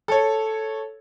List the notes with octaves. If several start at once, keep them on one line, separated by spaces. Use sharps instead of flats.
A4 C#5